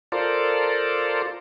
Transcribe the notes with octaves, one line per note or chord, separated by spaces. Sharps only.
F4 A4 A#4 C5 D5